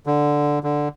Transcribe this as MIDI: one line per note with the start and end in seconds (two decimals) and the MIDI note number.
0.06 0.59 50
0.63 0.88 50